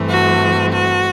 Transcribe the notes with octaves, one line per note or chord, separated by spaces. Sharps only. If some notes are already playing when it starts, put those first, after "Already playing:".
Already playing: G2 E3 A3 C4
F#4
F#4